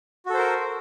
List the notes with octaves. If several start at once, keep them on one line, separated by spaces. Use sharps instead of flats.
F#4 A4 A#4 C5